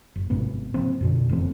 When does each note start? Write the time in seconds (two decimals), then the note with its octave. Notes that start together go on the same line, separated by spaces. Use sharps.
0.16 F#1
0.30 G#1 G#2 C3 B3
0.74 C#3 F3 A#3 C4
1.01 F#2 B2 D3
1.29 F1 E3 A3 C4